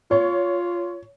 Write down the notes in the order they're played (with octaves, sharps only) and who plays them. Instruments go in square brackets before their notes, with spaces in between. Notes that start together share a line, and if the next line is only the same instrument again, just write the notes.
[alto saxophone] F4 [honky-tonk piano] C#5